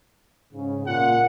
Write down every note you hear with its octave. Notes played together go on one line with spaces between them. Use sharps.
G#2 C#3
A#2 F#5